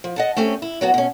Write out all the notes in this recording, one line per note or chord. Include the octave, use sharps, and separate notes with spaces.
F3
D#5 F#5 A5
A3 C4 C#4 G4
E4
F#3 B3 F#4
B2 C#4